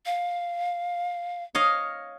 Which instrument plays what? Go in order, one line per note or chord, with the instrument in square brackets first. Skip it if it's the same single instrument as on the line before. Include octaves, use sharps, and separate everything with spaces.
[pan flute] F5
[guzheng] C#5 D#5 F5